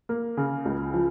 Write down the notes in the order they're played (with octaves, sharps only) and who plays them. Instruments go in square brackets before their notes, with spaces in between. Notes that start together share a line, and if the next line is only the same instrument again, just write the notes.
[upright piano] A#3
C#3
C#2
F3